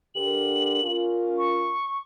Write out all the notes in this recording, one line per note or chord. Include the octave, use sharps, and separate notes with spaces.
D3 G4 A#4 F#7
C#4 F4 A#4
C#6